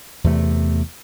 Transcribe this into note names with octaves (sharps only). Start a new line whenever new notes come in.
E2 C3 A3